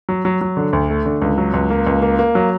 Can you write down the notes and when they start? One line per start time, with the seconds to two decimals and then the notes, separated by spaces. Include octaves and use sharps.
0.09 F#3
0.25 F#3
0.41 F#3
0.57 D3
0.73 D2
0.90 A3
1.06 D3
1.22 C#2
1.38 F#3
1.54 C#2
1.70 A#3
1.87 C#2
2.02 A#3
2.19 A#3
2.35 F#3